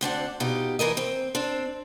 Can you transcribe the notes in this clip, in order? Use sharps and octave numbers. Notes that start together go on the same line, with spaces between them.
D2 C4 D4 F#5
B2 D#4 F4 G4
E3 A3 A#4 D#5
C4
C4 D4